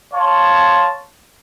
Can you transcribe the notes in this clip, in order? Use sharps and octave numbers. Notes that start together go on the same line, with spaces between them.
C#5 F5 A5 C6